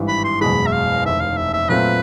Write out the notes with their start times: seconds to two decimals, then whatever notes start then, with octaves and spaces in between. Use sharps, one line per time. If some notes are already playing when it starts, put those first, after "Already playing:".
Already playing: G#1 G2 E3 G3
0.08 B5
0.24 C6
0.41 F#1 E2 B2 G#3 B5
0.67 E5
0.73 F5
1.04 F1 D#2 D#3 E5
1.20 F5
1.37 E5
1.53 E5
1.69 A#2 F#3 A3 C4 F4 B4